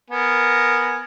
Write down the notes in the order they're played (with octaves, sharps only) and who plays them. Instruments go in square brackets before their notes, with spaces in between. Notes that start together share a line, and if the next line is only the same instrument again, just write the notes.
[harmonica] B3 A#4 G#5